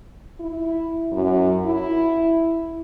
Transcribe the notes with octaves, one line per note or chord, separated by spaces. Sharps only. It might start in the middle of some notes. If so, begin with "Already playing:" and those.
E4
F#2
E4